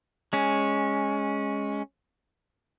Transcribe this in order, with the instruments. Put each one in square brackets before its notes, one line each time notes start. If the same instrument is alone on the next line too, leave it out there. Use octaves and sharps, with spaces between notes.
[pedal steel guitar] G#3 C#4